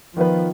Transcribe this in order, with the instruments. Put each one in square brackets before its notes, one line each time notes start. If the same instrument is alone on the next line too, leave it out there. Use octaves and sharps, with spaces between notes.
[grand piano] D#3 B3 F4 B4 [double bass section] F3